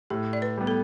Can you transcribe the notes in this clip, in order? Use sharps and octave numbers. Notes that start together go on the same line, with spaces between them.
A2 G4
D5
B4
G3 B3
A4